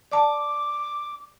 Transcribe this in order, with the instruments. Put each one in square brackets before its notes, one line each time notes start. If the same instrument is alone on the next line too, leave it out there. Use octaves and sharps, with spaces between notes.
[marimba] D5 A5 [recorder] D6